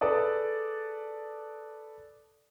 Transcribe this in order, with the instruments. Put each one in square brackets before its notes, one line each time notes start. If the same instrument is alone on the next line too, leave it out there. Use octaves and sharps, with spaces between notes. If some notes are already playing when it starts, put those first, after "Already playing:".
[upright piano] G#4 A4 B4 D5 D#6